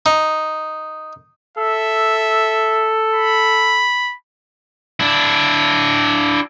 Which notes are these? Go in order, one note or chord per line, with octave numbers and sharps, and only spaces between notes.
D#4
A4 E5
B5
D4 E4